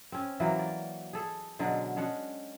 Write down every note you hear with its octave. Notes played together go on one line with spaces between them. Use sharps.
C4 C#4
E3 F#3 A#3
D5
G#4 A4
B2 D3 F#3 G#3
G#3 C#4 D4 F#5